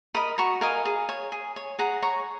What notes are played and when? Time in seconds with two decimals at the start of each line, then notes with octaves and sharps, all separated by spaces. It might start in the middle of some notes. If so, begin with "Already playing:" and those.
0.14 A#4 D#5 B5 D#6
0.38 F#4 A#5 C#6
0.61 A#4 D#5 F5 G#5
0.85 G#4
1.09 C#5
1.32 G#4
1.56 C#5
1.79 G#4 F#5 A#5
2.02 C#5 A#5 C#6